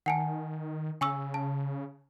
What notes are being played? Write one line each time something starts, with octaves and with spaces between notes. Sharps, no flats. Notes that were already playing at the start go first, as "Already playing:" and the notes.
D#3 F#5 G#5 A5
C#3 G#5 C#6 E6
A5